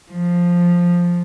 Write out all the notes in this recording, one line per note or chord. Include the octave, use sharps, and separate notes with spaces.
F3